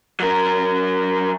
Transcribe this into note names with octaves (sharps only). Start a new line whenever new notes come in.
F#3 A#4